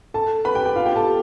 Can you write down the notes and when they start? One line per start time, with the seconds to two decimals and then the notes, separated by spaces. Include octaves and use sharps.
0.14 A4 A5
0.45 B4 B5
0.55 G4 G5
0.65 G4 G5
0.76 F4 F5
0.86 G4 G5
0.96 A4 A5